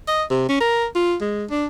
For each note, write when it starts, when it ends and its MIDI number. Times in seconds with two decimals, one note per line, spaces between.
0.08 0.23 75
0.31 0.45 48
0.49 0.57 61
0.61 0.86 70
0.95 1.16 65
1.21 1.45 56
1.50 1.66 62